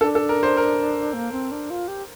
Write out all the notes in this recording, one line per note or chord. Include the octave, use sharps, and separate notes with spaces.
D4 A4
A4
A#4
C5
A#4
A#3
C4
D4
F4
G4